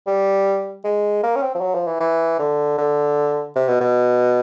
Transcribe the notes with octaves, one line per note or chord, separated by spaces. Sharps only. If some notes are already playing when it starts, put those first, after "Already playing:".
G3
G#3
A#3
C#4
C4
F3
F#3
F3
E3
E3
D3
D3
C3
B2
B2